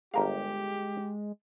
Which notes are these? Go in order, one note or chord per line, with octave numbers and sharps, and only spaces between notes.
G1 G#3 G4 A#4 F5